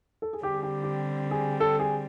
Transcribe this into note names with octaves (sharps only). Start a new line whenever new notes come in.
A4
G#4
D3 G3 C4 G4
G#4
G4
G4
G#4
A4
G#4